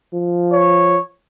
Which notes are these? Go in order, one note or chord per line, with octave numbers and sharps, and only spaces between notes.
F3
C#5